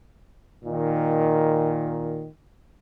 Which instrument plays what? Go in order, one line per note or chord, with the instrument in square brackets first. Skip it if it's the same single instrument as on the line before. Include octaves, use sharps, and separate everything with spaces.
[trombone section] A#2 D#3